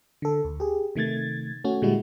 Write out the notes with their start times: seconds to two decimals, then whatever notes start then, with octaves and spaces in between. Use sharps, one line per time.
0.22 D3 A4
0.45 D2
0.60 G4 G#4
0.96 C3 D#3 A3 G#6 A6
1.64 A3 C#4 F#4
1.82 A#2 D3 G3 G#3 E4 F#4